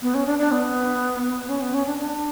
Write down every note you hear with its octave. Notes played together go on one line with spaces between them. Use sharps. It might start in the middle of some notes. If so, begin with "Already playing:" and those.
B3
C#4
D4
D4
B3
C#4
B3
C#4
D4
D4